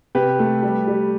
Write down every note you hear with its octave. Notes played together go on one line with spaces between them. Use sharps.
C3 G4 B4
A3
G3
G3